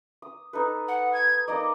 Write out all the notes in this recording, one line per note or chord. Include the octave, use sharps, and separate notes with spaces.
D#6
D#4 A4 B4
F#5
G#6
A#3 D#4 D5 D#5